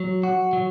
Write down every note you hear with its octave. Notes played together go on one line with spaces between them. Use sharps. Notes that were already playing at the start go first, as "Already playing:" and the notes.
Already playing: F#3
F#4
F#3